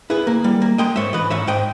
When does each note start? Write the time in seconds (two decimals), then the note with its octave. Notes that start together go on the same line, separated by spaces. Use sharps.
0.10 E4 G#4 B4
0.27 A#3
0.44 G3
0.62 A#3
0.78 G#3 D#5 G5
0.96 G#2 C#5 E5
1.13 E3 B4 D#5
1.31 G#2 C#5 E5
1.47 G#2 D#5 G5